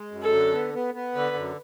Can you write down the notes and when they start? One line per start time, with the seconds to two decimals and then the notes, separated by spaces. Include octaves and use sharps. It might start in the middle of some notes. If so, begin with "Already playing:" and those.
Already playing: G#3
0.11 F#2
0.23 A4
0.32 D3
0.53 B3
0.74 B3
0.94 B3
1.15 D3 B4
1.36 F#2